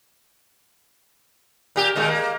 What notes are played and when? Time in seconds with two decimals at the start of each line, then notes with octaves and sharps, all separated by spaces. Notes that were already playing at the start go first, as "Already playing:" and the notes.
1.76 A#2 G4
1.96 A#2 D#3 G#3
2.08 A#3